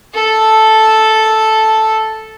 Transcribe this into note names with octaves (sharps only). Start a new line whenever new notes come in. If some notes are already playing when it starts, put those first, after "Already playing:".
A4 A5